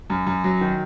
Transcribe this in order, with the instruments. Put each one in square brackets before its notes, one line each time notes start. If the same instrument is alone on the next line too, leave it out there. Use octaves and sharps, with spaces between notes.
[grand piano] F#2
F#2
F#3
D#3